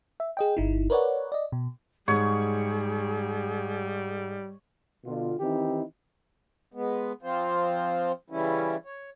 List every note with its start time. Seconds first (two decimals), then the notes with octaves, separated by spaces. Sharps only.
0.20 E5
0.37 G#4 D#5 G5
0.57 G1 D#4 E4
0.90 A#4 B4 C#5 D5 F#5
1.32 D5 D#5
1.52 B2
2.08 G#2 G3 G#4 C#5
5.04 B2 D3 B3 F4
5.40 D#3 E3 C4 D#4 E4 G4
6.74 G#3 B3
7.23 F3 C4 F4 C5
8.30 C#3 E3 G3 C#4 E4
8.85 C#5